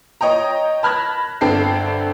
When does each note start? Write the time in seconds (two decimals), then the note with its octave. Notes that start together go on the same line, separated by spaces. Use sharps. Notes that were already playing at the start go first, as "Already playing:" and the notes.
0.21 C#5 D#5 G5 A#5
0.83 A5 B5 F6 F#6 G#6 A#6
1.41 G1 D3 C4 G5 A5 C7